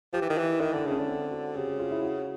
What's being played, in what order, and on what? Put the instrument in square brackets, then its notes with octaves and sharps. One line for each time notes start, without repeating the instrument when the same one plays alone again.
[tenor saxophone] F3 [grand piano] G4
[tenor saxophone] E3
D#3
E3
[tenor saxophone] D#3 [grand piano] E4
[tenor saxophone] D3 [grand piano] D4
[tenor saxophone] C#3
[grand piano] C#4
[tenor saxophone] D3
[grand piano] C4
F#4
[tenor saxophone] C#3 [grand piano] G4
[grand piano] F#4
F4
E4
F#4